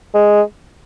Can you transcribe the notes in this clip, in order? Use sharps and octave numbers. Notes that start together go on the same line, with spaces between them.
G#3